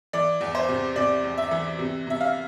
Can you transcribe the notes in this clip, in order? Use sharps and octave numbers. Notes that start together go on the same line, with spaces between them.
E3 D5
E2
C5
C3
C3 D5
E2
E5
E3
C3
C3 E5
F5